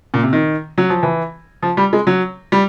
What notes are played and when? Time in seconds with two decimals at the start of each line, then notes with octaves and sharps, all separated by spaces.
0.14 A#2
0.23 C3
0.33 D#3
0.78 F#3
0.90 F3
1.03 E3
1.63 F3
1.77 G3
1.93 G#3
2.07 F#3
2.52 G3